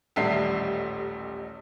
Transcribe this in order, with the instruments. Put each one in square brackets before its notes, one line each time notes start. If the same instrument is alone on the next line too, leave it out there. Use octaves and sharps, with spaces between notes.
[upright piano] D#1 A1 G3 A3 E5 C7